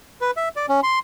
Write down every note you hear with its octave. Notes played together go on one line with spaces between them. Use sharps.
B4
E5
D5
C#4
C6